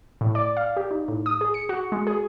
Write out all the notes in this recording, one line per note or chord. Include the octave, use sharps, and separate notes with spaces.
A2
D5
F5
G4
D#4
A2
D#6
G#4
C#7
F#4
G#3
G#4